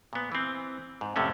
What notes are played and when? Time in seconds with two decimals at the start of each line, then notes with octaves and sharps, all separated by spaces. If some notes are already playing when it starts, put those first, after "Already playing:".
0.13 A#2 B3
0.32 E3 C4
1.01 G#2
1.16 F2 A2 C3 G#3 A3 C#4